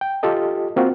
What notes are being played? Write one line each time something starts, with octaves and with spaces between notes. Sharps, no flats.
G5
F4 G4 A4 D#5
A#3 C4 F4 F#4